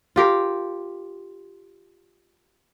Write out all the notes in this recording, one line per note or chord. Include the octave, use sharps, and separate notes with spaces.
F4 G4 A#4